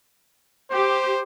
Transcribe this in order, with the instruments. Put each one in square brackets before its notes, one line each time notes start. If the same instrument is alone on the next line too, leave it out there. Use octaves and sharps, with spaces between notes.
[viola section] G4 [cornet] C5